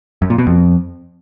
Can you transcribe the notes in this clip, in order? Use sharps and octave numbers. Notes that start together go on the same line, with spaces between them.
F#2
A#2
B2
F2